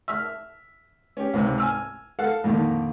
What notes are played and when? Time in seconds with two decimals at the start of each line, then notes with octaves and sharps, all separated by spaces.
0.08 E5 E6 F6
1.17 C#4 G4
1.34 C#2 G#2 C3
1.58 G#5 E6 F6
2.19 A4 F5 F#5
2.44 F2 A#2 D3 D#3